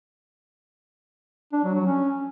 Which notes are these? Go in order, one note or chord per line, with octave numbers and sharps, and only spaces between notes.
D4
F#3
F#3
C#4